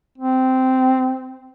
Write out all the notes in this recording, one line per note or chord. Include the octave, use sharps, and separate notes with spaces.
C4